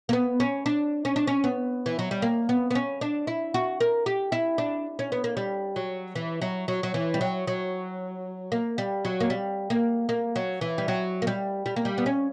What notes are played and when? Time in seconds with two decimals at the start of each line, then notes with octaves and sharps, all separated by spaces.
0.09 A#3
0.13 B3
0.40 C#4
0.66 D4
1.05 C#4
1.16 D4
1.27 C#4
1.44 B3
1.86 E3
1.99 F#3
2.11 G3
2.22 A#3
2.49 B3
2.71 B3
2.75 C#4
3.01 D4
3.27 E4
3.54 F#4
3.80 A#4
4.06 G4
4.32 E4
4.58 D4
4.99 C#4
5.12 B3
5.24 A#3
5.37 G3
5.76 F#3
6.15 E3
6.42 F#3
6.68 F#3
6.83 F#3
6.94 E3
7.14 G3
7.21 F#3
7.47 F#3
8.52 A#3
8.78 G3
9.05 F#3
9.20 A#3
9.30 G3
9.70 A#3
10.09 A#3
10.36 F#3
10.61 E3
10.78 G3
10.88 F#3
11.22 A#3
11.27 G3
11.66 G3
11.76 A#3
11.85 G3
11.98 B3
12.06 C#4